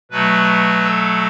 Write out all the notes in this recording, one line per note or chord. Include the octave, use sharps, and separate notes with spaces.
B2 F#3 A3 B4
A4